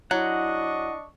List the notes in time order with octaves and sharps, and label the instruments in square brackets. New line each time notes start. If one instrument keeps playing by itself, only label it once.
[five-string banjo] F#3 [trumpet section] D4 D#5 C#6 [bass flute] E4 [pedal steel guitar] F#5